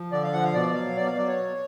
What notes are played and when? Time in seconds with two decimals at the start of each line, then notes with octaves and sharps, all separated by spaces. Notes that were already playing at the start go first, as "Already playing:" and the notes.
Already playing: F3
0.12 D3 D5
0.23 F5
0.33 F3 F#5
0.44 F5
0.54 B2 D5
0.75 F#3 F5
0.96 B2 D5
1.07 F5
1.17 F#3 D5
1.28 C#5
1.37 B2